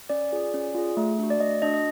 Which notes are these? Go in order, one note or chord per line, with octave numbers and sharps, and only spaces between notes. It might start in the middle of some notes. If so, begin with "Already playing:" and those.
C#4 D5
F4 G#4
C#4
F4 G#4
A3
D4 F#4
D5
A3 D#5
D4 F#4 D#5
D#5